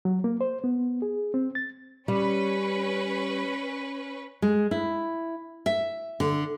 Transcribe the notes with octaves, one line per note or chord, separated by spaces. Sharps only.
F#3
A#3
C5
B3
G#4
C4
A6
G3 C#4 B4
G#3
E4
E5
D3